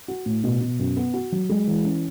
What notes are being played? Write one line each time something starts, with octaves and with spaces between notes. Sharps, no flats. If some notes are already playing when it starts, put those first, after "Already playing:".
F#4
A2
B2
B2
F#2
B3
F#4
F#3
G#3
E3
C#4